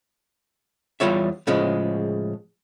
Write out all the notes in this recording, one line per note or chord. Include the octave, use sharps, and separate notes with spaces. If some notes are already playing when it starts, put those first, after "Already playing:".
E2 G3 F4 C#5 E5
A2 C#3 F3 G#3